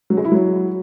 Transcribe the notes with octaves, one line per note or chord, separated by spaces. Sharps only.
F#3
G#3
E4
F#3